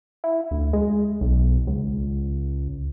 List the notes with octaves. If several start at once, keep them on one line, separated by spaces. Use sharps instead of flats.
E4
D2
G#3
B1
C#2